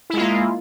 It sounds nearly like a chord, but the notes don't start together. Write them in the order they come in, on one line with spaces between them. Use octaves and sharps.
E4 G#3 F4 A#3